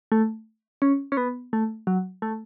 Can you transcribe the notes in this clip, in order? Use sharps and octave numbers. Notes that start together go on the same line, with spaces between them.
A3
C#4
C#4
B3
A3
F#3
A3